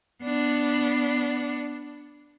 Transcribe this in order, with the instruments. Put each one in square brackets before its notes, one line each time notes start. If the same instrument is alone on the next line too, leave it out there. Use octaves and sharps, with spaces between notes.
[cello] B3 D4